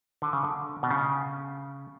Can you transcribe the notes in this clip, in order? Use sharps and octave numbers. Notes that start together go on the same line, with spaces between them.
D3
C#3
D3
B2
C#3